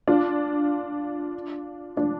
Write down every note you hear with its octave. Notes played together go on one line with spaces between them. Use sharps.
D4 F4
D4 F4